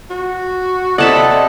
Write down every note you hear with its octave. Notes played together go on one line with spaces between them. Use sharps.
F#4
C3 A4 D5 D#5 F#5 A5 B5 D6